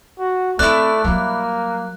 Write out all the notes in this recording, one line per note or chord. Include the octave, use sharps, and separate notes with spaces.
F#4
A3 C4 E4 D5 F#6
F#3 G3 A#3